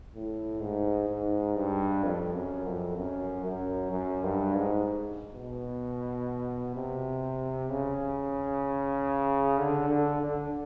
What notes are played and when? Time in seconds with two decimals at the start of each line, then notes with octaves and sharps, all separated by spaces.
0.15 A2
0.61 G#2
1.09 G#2
1.56 G2
2.04 F2
2.34 F#2
2.67 F2
2.98 F#2
3.45 F#2
3.92 F#2
4.24 G2
4.55 G#2
5.33 B2
6.75 C3
7.70 C#3
9.58 D3
9.89 D3
10.21 D3